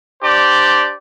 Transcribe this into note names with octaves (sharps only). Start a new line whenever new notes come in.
D4 G4 C5 D5